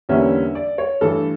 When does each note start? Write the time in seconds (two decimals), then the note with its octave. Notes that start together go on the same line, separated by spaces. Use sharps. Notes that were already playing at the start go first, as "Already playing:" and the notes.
0.09 E2 D3 G3 A#3 C#4 E5
0.55 D5
0.78 C#5
1.01 G2 E3 A3 A4